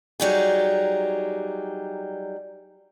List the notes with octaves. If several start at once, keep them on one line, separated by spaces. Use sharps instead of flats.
F#3 G3 D#4 G#4